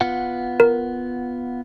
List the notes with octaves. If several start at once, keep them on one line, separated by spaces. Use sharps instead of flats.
B3 F4 F#5
A#4